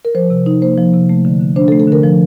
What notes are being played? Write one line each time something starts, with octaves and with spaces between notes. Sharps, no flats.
A#4
F3 C5
C3
D#4
A#3 C5
F3
C3
A3
D3
D3
D4 C5
A4
A3
A4
D3 A#4
F3